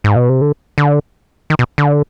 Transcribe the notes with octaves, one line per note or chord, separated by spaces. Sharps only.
G#2
B2
C3
D3
D3
D#3
B2
D3